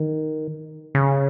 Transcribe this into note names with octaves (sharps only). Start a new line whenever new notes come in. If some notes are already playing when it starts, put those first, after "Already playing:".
Already playing: D#3
C#3